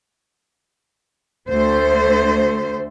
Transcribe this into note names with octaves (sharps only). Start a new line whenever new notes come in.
D2 A3 C5